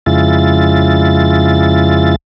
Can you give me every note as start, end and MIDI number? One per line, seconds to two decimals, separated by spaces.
0.06 2.16 41
0.06 2.16 49
0.06 2.16 56
0.06 2.16 64
0.06 2.16 65
0.06 2.16 93